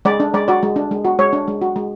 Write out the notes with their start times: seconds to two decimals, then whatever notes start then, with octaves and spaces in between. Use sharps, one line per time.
0.05 G#3 D5
0.20 D4
0.34 G#3 D5
0.48 F#4 D5
0.63 G#3
0.76 D4
0.91 G#3
1.05 F#4
1.19 G#3 C#5
1.33 D4
1.48 G#3
1.62 F#4
1.76 G#3